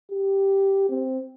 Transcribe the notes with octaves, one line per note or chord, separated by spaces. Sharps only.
G4
C4